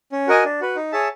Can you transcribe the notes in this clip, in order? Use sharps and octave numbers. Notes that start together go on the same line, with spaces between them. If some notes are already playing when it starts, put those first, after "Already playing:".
C#4
F#4 A#4 D#5 G#5
D4
F#4 B4
D#4
G#4 C#5 E5 A5